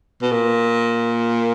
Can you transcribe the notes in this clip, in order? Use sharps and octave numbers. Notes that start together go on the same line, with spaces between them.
B2
A#2